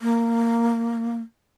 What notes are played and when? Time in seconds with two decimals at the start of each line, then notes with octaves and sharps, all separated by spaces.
0.01 A#3